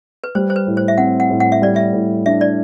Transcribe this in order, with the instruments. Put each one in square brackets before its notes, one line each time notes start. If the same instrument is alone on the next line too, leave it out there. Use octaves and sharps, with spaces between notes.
[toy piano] B4
[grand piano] G3 [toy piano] C5
[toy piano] C5
B4
[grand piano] A2
[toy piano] C5
E5
[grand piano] C4 [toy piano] F#5
[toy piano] F#5
[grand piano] A2
[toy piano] F#5
E5
[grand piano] G3 [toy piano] D5
[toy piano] E5
[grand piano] A2
[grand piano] D4 [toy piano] E5
[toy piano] D5